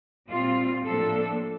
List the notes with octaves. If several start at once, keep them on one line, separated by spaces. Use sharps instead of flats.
A#2 G3 C4 F4
A2 F3 A#3 D4 A4